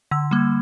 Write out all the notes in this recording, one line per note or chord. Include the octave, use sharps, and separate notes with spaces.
D3 E6
G3 A#3